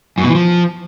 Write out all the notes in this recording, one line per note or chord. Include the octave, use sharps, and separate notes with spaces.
F#2
B2
E3
F3